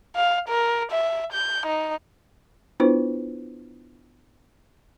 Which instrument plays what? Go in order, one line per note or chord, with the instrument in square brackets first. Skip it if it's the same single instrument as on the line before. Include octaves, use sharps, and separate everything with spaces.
[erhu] F5
A#4
E5
G6
D#4
[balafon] B3 D4 E4 F4 B4 C5